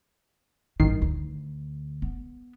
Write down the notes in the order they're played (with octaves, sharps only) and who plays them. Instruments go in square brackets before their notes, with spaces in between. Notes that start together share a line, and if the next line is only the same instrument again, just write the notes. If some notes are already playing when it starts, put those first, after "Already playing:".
[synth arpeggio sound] A1 D#3 C7 [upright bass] G2
[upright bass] D2
B3